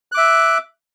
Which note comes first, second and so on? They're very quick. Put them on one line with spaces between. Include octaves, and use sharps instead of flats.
F#6 D6 E5